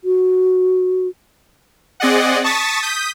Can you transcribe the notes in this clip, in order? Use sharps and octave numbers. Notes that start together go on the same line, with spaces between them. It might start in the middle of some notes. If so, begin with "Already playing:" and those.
F#4
C4 G#4 D5 D#5 F#5
A5 C#6 D#6 A6 B6
D#6 G6 B6